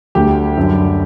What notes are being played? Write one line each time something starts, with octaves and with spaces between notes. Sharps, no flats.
D2 D3 G3 G4
F#2 D3 G3